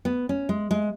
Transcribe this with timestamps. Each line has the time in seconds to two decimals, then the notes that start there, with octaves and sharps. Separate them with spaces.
0.05 B3
0.29 C#4
0.49 G#3
0.71 G#3